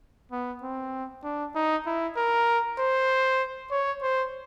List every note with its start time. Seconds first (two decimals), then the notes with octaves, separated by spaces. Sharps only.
0.32 B3
0.62 C4
1.24 D4
1.55 D#4
1.86 E4
2.17 A#4
2.79 C5
3.71 C#5
4.02 C5